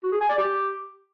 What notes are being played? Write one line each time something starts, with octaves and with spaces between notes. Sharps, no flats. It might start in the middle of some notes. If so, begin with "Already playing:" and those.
F#4
G#4
G#5
D5
G4